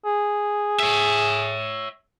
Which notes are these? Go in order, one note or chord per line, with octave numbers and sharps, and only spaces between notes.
G#4
C#5 E5